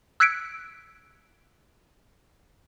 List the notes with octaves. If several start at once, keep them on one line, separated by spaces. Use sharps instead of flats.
E6 F#6 G#6 B6 C#7 D7